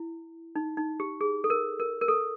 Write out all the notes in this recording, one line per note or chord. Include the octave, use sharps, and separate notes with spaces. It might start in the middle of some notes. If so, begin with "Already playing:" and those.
Already playing: E4
D#4
D#4
G4
G#4
A4
A#4
A#4
A#4
A4